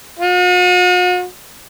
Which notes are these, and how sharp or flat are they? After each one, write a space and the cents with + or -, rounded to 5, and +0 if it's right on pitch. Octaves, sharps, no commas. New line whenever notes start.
F#4 -45